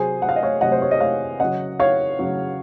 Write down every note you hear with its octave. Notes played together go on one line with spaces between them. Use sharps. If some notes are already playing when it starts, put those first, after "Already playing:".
Already playing: C3 F#3 G#4 C5
F#5
F5
D#5
C#5 F5
C3 F#3 D#5 F#5
C5
C#5
D#5
C#5 F5
C#3 F#3 D#5 F#5
C#5 F5
C#3 F#3